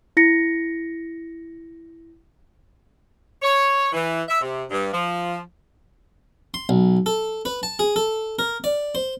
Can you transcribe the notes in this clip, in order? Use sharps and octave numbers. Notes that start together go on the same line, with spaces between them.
E4 A#6 C#7
C#5
E3
E5
C3
G2
F3
C6
B1
A4
B4
A5
G#4
A4
A#4
D5
C5